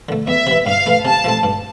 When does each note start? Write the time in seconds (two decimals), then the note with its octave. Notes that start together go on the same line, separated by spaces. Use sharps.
0.09 D3 A3
0.27 E2 E5
0.47 C3 E3
0.66 G2 F5
0.86 E3 A3
1.05 C3 A5
1.24 F3 A3 C4
1.43 G2